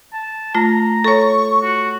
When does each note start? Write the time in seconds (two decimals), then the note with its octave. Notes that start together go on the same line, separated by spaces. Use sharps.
0.13 A5
0.55 A3 F4 A#5
1.04 A4 C#5 C#6
1.63 F#4